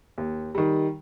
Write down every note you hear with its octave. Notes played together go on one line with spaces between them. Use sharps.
D#2
D#3 G3